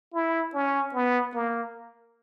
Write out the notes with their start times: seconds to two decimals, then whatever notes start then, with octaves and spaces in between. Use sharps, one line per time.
0.14 E4
0.54 C#4
0.94 B3
1.34 A#3